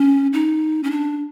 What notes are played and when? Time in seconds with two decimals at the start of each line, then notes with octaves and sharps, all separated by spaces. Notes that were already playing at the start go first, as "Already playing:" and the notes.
Already playing: C#4
0.33 D#4
0.83 C#4
0.91 D4